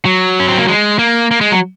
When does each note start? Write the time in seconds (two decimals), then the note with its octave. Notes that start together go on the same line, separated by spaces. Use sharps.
0.05 F#3
0.40 C#4
0.48 C4
0.58 A#3
0.68 G#3
0.99 A#3
1.31 A#3
1.41 G#3
1.52 F#3